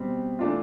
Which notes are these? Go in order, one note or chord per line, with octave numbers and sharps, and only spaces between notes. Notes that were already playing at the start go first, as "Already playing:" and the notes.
Already playing: B2 G3 C4
E3 A3 D4 F4